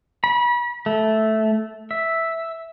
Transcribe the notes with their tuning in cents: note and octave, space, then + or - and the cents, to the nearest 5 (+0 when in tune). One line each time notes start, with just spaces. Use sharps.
B5 -35
A3 -10
E5 -5